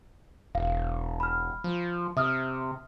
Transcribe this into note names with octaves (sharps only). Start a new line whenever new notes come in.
E1 F5
B5 F6
F3
C3 E5 D#6 F6